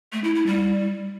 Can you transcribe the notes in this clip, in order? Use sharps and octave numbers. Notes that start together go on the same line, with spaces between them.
A3
E4
E4
G3